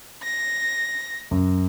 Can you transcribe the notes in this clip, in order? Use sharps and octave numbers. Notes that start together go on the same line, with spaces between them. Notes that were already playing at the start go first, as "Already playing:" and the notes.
A#6
F#2